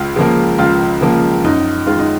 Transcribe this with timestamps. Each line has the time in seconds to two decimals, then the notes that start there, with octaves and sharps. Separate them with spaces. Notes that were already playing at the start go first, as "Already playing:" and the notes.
Already playing: C#2 F4
0.16 C#3 F3 A#3
0.59 C#2 F4
1.01 C#3 F3 A#3
1.44 F#2 D#4
1.86 D#3 G#3 F4
1.99 D#4